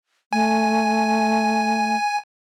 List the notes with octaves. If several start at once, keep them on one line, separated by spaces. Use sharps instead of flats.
A3 G#5